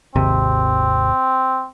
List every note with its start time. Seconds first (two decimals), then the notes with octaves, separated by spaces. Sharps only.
0.16 G#1 D#2 C3 C4